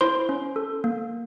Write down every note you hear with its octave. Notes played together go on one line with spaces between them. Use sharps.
E4 C5 C6
C#4
A4
A#3